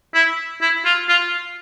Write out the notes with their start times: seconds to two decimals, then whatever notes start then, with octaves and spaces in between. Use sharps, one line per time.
0.14 E4
0.61 E4
0.85 F4
1.09 F4